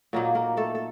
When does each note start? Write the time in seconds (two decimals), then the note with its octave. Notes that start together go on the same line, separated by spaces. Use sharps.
0.13 A#2 F#3 A#3 D#4
0.35 A#3 A#4
0.57 A3 A4
0.75 A4